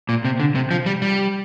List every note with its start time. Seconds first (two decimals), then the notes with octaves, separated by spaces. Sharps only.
0.09 A#2
0.25 C3
0.40 D3
0.55 C3
0.71 F3
0.86 G3
1.02 G3